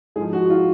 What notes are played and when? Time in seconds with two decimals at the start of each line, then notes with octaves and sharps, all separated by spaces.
0.16 G#2 G#4
0.20 F3
0.33 F#4
0.50 F4